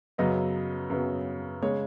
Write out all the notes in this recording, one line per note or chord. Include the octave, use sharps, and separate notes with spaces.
F#2 C#3 F#3 B3 D#5
F#2 C#3 F#3 B3
C#3 G#3 C#5